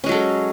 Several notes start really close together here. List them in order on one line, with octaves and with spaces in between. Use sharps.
C#4 G#3 F#3 A4